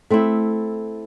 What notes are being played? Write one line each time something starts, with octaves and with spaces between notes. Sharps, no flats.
A3 C4 E4